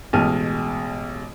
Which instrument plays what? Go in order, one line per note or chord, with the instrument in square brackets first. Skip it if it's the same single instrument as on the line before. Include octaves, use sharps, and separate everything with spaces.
[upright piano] A1 B2 G#3 A5 F6 D#7